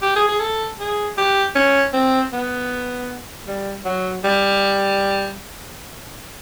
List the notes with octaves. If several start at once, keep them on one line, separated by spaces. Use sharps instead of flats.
G4
G#4
G#4
A4
G#4
G4
C#4
C4
B3
G3
F#3
G3